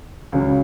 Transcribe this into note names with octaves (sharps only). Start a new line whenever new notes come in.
C#2 C#3 F#3 C#4